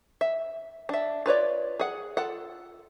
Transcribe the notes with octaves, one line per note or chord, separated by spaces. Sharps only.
E5
D4 E5
F4 B4 C#5 D5
G#4 F#5
F4 A4 F#5